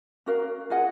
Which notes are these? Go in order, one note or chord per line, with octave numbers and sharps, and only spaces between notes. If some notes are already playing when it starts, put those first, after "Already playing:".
C#4 F#4 A#4 F5
F4 G#4 D#5 F#5